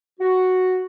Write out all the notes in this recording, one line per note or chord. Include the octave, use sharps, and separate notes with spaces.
F#4